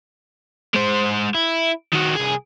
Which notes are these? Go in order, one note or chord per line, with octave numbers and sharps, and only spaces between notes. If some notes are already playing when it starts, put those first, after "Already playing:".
G#3 C5
E4
D#3 F#4
C2 G#4